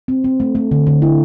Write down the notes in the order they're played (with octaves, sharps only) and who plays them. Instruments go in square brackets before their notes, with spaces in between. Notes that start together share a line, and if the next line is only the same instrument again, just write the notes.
[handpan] C4
C4
A3
A3
D3
D3
E4